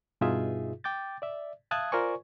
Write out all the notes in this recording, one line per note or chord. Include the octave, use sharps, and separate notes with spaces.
G2 B2 D#4 F4 G#4 E5
G5 D6 G6 A6
D5 E5
E5 F5 A5 D#6 F#6 G#6
F4 A#4 C5 D5 G#5 C#6